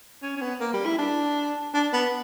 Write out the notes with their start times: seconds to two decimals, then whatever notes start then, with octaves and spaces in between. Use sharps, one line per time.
0.23 C#4
0.37 C#4
0.42 B3
0.60 A#3
0.73 G3
0.86 E4
0.99 D4
1.74 D4
1.93 B3